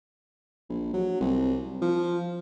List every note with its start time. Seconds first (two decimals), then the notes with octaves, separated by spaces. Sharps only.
0.69 A#1
0.93 F#3
1.20 C2
1.82 F3